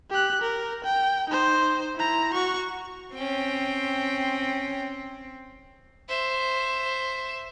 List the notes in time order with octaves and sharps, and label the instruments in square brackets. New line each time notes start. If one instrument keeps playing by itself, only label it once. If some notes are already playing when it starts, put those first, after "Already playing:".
[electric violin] G4 F#6
A#4
G5
D#4 C5
E4 A#5
F#4 C#6
[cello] C4 [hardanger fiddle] C#4 G5
[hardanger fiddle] C5 E5